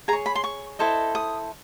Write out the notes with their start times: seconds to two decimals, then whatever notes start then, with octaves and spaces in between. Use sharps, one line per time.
0.08 G#4 A#5
0.13 C#5
0.26 B5
0.35 C6
0.44 C#6
0.79 E4 A4 C5 D#5
1.15 D#6